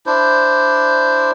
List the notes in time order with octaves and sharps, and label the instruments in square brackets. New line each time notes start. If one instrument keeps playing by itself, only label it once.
[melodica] D4 E4 C5